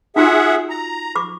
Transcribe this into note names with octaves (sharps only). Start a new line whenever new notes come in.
D#4 F4 F#4 G#4 E5 F#5
A#5
B5 C#6 D6